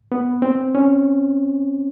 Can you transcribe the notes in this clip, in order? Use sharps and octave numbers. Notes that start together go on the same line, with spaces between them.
B3
C4
C#4